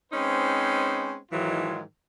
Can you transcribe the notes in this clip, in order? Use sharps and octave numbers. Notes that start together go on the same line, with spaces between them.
G#3 C4 C#4 D#4 B4 C5
G#2 D#3 E3 F#3 G#3 F4